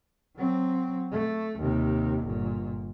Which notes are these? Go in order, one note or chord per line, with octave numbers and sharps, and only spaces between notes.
F#3 C4
A3
D#2 C3
G1 A#2